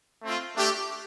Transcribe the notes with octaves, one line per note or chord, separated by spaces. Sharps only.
A3 C4 F4
A3 D4 G4